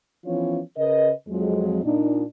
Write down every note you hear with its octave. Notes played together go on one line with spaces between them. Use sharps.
E3 F3 B3 C#4 F4 C#5
C#3 A#4 B4 D#5
F2 F#3 G#3
A#2 D4 D#4